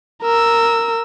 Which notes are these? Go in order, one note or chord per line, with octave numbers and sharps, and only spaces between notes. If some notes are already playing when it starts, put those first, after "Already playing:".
A#4 E6